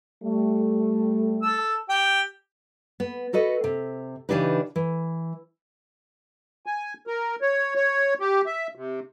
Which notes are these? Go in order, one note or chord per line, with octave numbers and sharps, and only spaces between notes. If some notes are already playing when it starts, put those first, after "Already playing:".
G3 A3
A4 E6
G4 G5
B3
F#4 A4 B4 D#5
C3
C#3 E3 D4 D#4 G4 B4
E3
G#5
A#4
C#5
C#5
G4
E5
C3